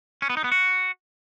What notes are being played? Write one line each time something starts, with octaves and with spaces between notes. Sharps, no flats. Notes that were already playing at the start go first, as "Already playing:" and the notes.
C#4
B3
D#4
B3
F#4